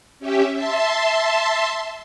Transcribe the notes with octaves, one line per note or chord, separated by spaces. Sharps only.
C#4 G4 E5
E5 A5 C6